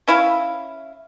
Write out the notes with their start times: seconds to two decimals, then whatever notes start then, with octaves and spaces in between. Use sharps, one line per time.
0.08 C#4 E4 F5